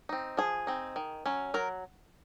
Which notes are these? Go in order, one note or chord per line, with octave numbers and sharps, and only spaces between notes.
C4 D#4
F3 G#4
C4 D#4
D#3
F#3 C#4
F#3 A#4